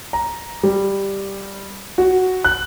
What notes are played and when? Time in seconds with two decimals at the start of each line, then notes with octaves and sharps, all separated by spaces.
0.13 A#5
0.63 G3
1.98 F#4
2.44 F#6